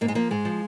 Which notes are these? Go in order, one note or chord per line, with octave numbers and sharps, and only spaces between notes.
G#2 A#3
G#3
F3 A#3
G#2 G#3
F3